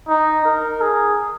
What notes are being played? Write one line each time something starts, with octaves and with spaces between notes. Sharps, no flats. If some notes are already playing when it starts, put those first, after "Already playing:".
D#4
A#4
G#4